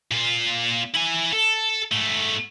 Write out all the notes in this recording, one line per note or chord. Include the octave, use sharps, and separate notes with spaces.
A#2 F4
E4 G#5
A4
G#2 A3